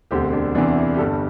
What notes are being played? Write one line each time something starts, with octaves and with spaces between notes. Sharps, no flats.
E1 D2 D3 C4 G4
D4
E2 C3 E3 D4
E4
G4
G1 G2 G3 A4